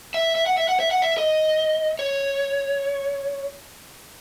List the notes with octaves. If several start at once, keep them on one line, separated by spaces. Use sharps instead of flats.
E5
E5
F#5
E5
F#5
E5
F#5
E5
D#5
C#5